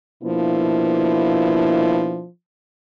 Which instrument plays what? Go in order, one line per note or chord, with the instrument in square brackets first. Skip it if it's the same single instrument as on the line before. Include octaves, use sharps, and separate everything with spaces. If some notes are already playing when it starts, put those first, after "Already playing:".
[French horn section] B2 F3 A#3 D4 E4